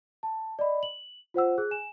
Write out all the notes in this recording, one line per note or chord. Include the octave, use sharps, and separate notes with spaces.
A5
D5 D#5 B5
F#7
F4 C5 F#5 E6
G#4 F#6
G#5 E7